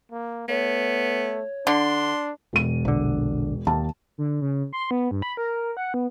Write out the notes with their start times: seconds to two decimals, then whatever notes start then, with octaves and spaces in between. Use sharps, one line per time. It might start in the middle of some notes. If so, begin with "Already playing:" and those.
0.12 A#3
0.48 A3 B3 C#5
1.67 D3 D4 C6
2.53 E1 D#7
2.85 A#1 D3
3.67 D#2 A5
4.18 D3
4.42 C#3
4.73 C6
4.91 B3
5.11 G2
5.22 B5
5.37 A#4
5.77 F#5
5.94 B3